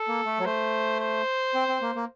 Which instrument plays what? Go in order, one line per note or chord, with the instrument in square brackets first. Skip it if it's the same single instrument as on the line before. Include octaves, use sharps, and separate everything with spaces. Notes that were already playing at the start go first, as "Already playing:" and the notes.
Already playing: [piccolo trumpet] A4
[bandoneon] A#3
A3
F#3
[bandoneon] A3 [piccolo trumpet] C5
[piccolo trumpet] C5
[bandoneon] C4
C4
A#3
A#3